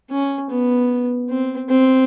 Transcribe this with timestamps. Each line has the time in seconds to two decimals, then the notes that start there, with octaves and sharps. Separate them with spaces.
0.10 C#4
0.50 B3
1.29 C4
1.69 C4